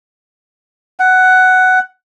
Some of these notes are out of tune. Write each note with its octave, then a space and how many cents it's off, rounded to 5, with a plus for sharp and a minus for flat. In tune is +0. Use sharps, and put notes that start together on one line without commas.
F#5 +10